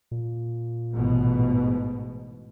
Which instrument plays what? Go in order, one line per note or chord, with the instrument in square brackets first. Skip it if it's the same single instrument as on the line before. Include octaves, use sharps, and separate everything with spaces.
[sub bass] A#2
[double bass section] A1 G#2 B2